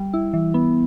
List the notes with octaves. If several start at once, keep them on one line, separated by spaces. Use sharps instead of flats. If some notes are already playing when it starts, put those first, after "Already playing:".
Already playing: G3
E4
E3
B3